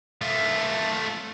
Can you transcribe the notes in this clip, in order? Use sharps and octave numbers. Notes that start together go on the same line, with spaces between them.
A3 F4